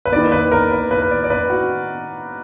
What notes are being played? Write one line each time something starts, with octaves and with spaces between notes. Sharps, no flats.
B4
D#3 A#3 D5
B4
A#4
B4
B4
B4
D5
D5
B4
F#4